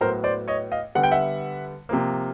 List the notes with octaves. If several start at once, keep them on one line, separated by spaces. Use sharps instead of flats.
A2 F#3 B3 A#4 C5
C5 D5
C#5 D#5
D#5 F5
D3 G3 B3 F#5
G5
E5 F#5
C3 F3 A#3